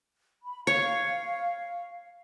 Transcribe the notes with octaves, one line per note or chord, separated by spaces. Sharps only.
B5
C#5 F5